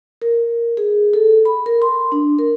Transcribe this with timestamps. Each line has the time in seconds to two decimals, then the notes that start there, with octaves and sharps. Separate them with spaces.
0.22 A#4
0.77 G#4
1.13 A4
1.45 B5
1.66 A#4
1.82 C6
2.12 D4
2.39 A#4